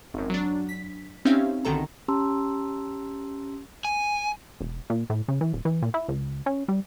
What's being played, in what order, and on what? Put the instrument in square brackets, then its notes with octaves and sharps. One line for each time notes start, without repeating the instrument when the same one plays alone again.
[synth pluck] G#1 F#2
F#3 D4
B6
C4 C#4 D#4 G4 E5 F5
B1 D3 D#3 A4 A#5
[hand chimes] C#4 G4 A5 A#5 C6 E6
[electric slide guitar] G#5
[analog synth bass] E1
A#2
A2
C#3
E3
D#1
E3
A#2
E4
C#2
C#4
G3